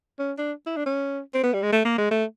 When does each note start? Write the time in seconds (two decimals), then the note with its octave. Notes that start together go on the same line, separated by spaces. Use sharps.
0.19 C#4
0.38 D4
0.66 E4
0.76 D4
0.86 C#4
1.34 C4
1.43 B3
1.53 G3
1.62 G#3
1.72 A3
1.85 A#3
1.98 G#3
2.11 A3